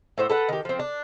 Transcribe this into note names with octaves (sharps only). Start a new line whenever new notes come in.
A2 C5 E5 F#5
A4 B4 F#5
D#3 G4
F3 C4
D4